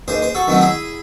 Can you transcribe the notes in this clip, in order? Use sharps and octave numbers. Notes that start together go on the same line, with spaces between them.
D#2 G#4 C5
C5
F#4 A4
D#3 F#3 A3 C4
E4 G#4